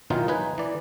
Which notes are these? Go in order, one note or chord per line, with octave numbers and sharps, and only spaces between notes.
B2 D#3 E3 F#3 D#4 F4
D#4 B4 G#5
E3 D5